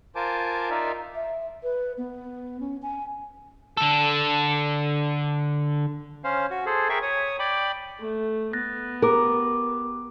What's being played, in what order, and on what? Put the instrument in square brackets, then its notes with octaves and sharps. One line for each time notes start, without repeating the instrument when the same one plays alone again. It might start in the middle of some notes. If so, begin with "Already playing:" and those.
[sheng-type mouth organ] F4 A#4 C5 G#5 A5 D6
D#4 F4 A#4 D5 E5 F5
[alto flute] E5
B4
B3
C#4
G#5
[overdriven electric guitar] D3 A4
[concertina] C#4 C5 F5
F#4
G#4 A4 C5
G#4 A#4 E5 G5 C#6
C#5 D#6
D5 G5 B5 D6
[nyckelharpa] A3
[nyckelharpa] B3 [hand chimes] F#6 A6 A#6
[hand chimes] G4 D6 [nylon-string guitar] A#4